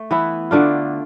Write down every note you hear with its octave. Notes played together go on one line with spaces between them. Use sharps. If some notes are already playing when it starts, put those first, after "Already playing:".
Already playing: A3
E3 B3 E4
D3 A3 D4 F4